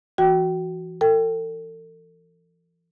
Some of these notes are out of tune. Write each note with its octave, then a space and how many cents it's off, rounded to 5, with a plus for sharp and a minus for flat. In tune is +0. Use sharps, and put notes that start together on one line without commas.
E3 +30 F#4 +0 G5 -25
A4 +40 G5 +0